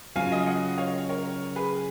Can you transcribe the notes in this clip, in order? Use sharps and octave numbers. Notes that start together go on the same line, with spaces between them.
C#3 F#3 C#4 F4 F5 G#5
D#5
F5
D#5 F#5
C#5 F5
A#4 C#5
G#4 B4